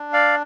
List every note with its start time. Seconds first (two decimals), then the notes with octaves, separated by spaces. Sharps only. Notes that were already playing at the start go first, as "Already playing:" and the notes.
Already playing: D4
0.13 D5 F5